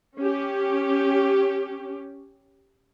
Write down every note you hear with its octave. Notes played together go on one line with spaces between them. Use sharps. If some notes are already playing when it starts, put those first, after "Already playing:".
C#4 G4